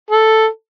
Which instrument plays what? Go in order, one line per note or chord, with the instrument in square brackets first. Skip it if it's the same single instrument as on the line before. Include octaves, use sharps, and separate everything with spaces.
[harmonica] A4